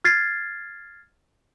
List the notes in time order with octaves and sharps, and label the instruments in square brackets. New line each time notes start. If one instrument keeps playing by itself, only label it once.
[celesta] F6 G#6 A6 C7